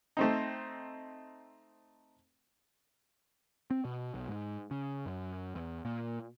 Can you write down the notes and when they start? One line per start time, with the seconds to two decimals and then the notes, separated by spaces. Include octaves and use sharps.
0.17 A3 C4 D#4
3.70 C4
3.85 B2
4.14 B1
4.28 G#2
4.71 C#3
5.06 F#2
5.55 E2
5.85 A#2